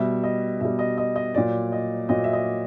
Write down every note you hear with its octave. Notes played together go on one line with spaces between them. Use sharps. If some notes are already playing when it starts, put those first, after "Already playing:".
Already playing: B2 G3 E5
D#5
B2 G3 E5
D#5
D#5
D#5
A#2 F#3 D5
D#5
A#2 F#3 D#5
E5
D#5